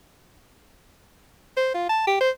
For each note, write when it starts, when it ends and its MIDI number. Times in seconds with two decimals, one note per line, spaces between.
1.57 1.70 72
1.74 1.88 65
1.89 2.05 81
2.07 2.16 67
2.20 2.30 72